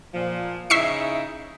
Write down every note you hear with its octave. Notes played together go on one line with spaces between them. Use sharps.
A#2 F3
C#3 D#4 E4 E5 C#6 C7